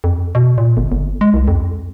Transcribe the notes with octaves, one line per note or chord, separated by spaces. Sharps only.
F2
B2
A#2
G1
G1
G#3
C2
F2